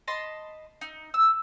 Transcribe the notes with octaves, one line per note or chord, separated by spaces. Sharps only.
D#5 A5 B5 C6
D#4
E6